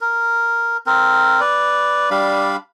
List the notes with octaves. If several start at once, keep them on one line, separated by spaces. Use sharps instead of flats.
A#4
C4 A#4
B4 D5
G3 D4 F5 B5